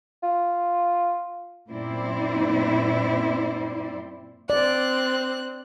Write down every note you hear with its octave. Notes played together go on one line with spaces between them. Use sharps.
F4
F#2 A#2 C4 E4 C5 D5
C4 D5 F#6